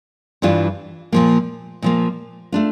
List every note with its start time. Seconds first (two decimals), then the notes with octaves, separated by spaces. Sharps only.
0.42 G2 E3 G3 D4 F4
1.12 A#2 F3 A#3
1.82 A#2 F3 A#3
2.52 A3 D4 F4